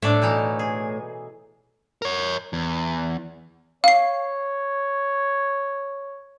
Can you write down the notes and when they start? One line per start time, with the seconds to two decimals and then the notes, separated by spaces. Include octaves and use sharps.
0.02 A2 D4 D5 E5
0.22 B2 E3 D#4
0.59 G#4
2.02 A#4 C#5
2.53 E2
3.84 C#5 F5 C7